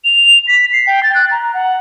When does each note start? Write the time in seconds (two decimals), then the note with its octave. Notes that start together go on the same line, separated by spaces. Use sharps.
0.04 F7
0.47 B6
0.73 C7
0.87 G5
1.03 A6
1.15 F#6
1.31 A#5
1.54 F#5